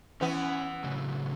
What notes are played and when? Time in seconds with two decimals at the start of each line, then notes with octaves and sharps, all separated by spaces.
0.21 E3 B3 C#4
0.84 A2 C#3 F#3